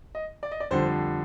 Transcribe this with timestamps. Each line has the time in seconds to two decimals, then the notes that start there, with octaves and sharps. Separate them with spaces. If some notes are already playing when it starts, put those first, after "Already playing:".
0.15 D#5
0.43 D5
0.51 D#5
0.60 D5
0.71 F2 D3 G3 D4 C5